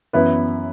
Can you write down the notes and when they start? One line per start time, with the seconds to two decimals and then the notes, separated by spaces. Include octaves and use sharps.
0.13 F#2 E3 B3 E4 B4